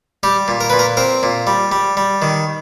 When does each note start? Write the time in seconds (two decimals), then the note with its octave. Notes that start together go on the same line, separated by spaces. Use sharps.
0.23 G3 G4
0.48 A#2
0.61 A#4
0.70 A#2 B4
0.79 A#4
0.97 C4 A#4
1.23 A#2
1.47 G3
1.72 G3
1.97 G3
2.22 D#3